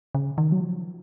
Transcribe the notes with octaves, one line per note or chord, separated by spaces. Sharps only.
C#3
D#3
F#3
F3